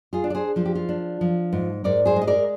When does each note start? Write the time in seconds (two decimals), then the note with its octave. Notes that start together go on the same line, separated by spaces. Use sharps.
0.13 F4 G#4
0.24 D4
0.30 D5
0.35 G#4 C5
0.56 F3 F4
0.66 G4
0.75 F4
0.89 D4
1.21 F3
1.53 G#2
1.84 G#2 A#4 D5
2.06 G#4 C5
2.16 G#3
2.22 D#5
2.27 A#4 D5